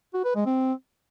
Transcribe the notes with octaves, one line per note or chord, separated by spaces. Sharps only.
F#4
B4
G#3
C4